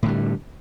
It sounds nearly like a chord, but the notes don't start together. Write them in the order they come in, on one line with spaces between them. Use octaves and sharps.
A2 D3 G3